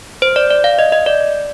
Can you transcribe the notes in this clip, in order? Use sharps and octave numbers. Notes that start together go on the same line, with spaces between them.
C5
D5
D5
F5
D#5
D#5
D5